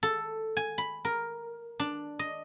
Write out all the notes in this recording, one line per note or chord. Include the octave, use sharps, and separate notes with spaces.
A4
G#5
B5
A#4
D4
D#5